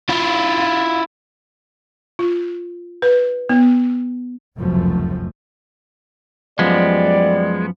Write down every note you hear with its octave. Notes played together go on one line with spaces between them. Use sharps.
E4 F4
F4
B4
B3
F1 C#2 F#2 B2 F3 A3
F#2 F3 G3 G#3 B3 D5